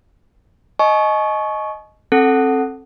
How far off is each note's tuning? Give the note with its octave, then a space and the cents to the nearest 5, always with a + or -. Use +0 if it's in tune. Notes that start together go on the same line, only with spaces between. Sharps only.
D#5 +0 G#5 +45 C#6 +0
C4 +25 A4 +0 F#5 +0